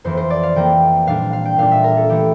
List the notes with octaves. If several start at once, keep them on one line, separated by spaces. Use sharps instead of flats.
F2 E3 A#3 C5
C5
D5
F5
F2 E3 A#3 G5
A#2 G3 D4 F5
F5
G5
A#2 G3 D4 F5
E5
A#4
A4
E3 A3 G4